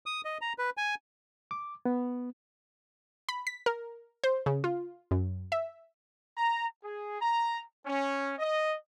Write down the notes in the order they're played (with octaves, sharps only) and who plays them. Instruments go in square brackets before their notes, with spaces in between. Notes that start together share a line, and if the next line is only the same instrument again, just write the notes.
[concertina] D#6
D#5
A#5
B4
G#5
[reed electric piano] D6
B3
[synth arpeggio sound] B5
B6
A#4
C5
C#3
F4
F#2
E5
[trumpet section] A#5
G#4
A#5
C#4
D#5